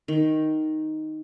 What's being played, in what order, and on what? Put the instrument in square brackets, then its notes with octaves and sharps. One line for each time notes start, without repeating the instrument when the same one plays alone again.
[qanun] D#3